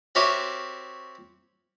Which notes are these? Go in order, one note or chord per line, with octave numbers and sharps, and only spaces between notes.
C4 F#4 G4 A#4 C#5 E5